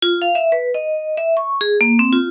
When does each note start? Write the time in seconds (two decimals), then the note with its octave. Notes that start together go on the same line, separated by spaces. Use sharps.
0.02 F4
0.22 F5
0.35 E5
0.52 B4
0.74 D#5
1.17 E5
1.37 C#6
1.61 G#4
1.81 A#3
1.99 C4
2.12 F4